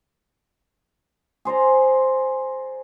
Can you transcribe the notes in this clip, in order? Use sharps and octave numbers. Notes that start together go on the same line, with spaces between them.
G#4 C5 D5 A#5